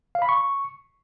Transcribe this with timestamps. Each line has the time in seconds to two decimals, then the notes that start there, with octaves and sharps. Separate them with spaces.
0.15 F5
0.22 B5
0.29 C#6